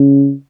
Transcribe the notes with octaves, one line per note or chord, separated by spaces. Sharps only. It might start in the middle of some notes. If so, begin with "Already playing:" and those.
Already playing: C#3